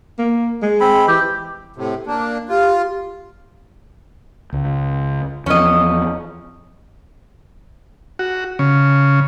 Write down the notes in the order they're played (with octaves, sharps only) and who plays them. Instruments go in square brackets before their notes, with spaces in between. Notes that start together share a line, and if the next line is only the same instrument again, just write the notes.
[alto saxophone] A#3
G#3
[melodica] C4 B5
[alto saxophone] E3 [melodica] G4
[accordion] A2 C3
A#3 D4
[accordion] F4 [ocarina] G4
[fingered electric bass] C#2
[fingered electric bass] E2 F3 [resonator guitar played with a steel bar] C#4 D#5
[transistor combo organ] F#4
C#3